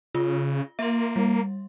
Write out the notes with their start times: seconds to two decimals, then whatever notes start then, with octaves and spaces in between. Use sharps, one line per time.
0.15 C#3 F4
0.79 A#3 E5 C6
1.16 G3